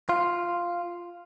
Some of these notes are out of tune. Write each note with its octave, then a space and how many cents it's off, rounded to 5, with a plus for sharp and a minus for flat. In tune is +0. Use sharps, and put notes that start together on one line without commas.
F4 +0